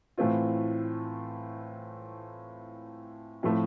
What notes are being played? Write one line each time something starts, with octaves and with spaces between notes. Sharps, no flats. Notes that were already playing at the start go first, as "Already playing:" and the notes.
A2 E3 A3 C4 F4
A2 F3 A3 C4